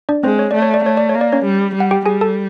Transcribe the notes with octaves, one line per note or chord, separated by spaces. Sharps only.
D4 D5
G#3 C4 C5
C#5
A3 D5
C#5
D5
A3 C#5
D5
C#5
A#3
D5
C#4 C#5
G3
G3
F#5
G4 G5
G3 G#4 G#5
A4 A5